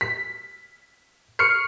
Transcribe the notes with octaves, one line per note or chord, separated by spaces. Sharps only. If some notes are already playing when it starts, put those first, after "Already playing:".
B6
C#6 F6 C7 C#7